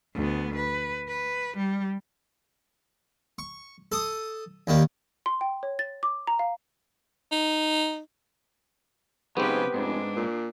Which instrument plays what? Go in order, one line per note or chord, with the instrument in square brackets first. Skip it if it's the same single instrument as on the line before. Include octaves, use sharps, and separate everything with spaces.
[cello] D2 B3
B4
B4
G3
[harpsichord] C#6
A4 D#6
D#2 D#3 G3 A#3
[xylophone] C6
G5
C#5
A6
D6
A#5
F5
[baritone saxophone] D#4
[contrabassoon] G#2 [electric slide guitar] C#3 F#3 [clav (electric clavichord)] B3 C4 [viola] G4 B4
[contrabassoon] F1 [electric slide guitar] G#2 [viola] D4
[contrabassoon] A#2